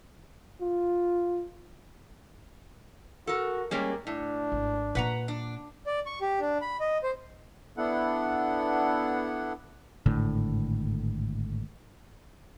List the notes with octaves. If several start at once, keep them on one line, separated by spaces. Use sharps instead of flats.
F4
F#4 A4 A#4
G3 G#3 A#3 C#4
A2 D4
G#1
A#2 A#3 B4 F#5 A#5
D4
D5
C#6
G4
D4
B5
D#5
C5
B3 D4 E4 A4 F#5
G#1 A2 D3